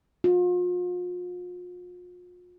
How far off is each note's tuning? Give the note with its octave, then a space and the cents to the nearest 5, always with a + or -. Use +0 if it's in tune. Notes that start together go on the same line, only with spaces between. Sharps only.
F4 +40